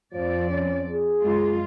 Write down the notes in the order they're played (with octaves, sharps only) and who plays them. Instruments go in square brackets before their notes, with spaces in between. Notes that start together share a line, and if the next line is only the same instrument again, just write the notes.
[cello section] F2 D5 [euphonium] F3
[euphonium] C#4
G#4
[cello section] F#2 G#3 F4